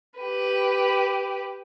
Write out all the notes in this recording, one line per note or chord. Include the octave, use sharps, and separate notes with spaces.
G4 B4